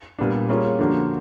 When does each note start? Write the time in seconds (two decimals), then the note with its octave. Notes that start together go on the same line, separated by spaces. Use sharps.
0.19 A#2 G3 B3 D4
0.49 G3 A#3 C#4 F4 G#4
0.79 D3 F3 A#3 D4 F#4